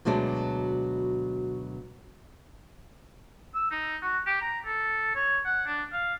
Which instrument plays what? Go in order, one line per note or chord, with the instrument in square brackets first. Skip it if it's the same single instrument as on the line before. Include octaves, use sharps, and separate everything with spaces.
[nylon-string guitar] D2 B2 F#3 G#3 D4
[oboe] E6
D#4
F#4
G4
A#5
A4
C#5
F#5
D4
F5